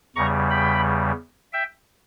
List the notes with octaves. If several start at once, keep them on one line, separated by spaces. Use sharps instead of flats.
E2 C#3 G3 A#5 C#6
G5 B5
E5 G5